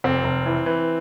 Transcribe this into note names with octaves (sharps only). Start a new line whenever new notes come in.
F1 C4
F1
E3
E3